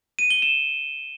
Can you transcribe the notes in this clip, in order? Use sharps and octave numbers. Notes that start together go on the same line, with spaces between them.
D#7
G7
E7